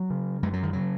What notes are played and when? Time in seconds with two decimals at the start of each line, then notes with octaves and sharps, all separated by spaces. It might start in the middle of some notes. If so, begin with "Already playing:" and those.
Already playing: F#3
0.10 C#3
0.43 F#2 G#3
0.53 F#3
0.63 D#3
0.73 C#3 F#3